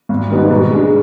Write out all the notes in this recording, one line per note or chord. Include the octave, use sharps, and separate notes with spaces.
G#1
G#2 G3 B3 D#4
B2
G#3 D4